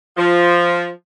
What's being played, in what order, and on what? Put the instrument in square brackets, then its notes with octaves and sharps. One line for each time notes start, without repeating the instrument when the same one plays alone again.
[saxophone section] F3